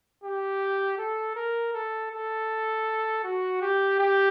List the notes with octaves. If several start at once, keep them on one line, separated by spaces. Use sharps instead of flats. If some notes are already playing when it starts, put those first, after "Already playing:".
G4
A4
A#4
A4
A4
F#4
G4
G4